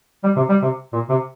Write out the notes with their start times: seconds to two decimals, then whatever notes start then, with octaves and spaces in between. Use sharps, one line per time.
0.24 G3
0.36 C3
0.49 G3
0.62 C3
0.93 A#2
1.09 C3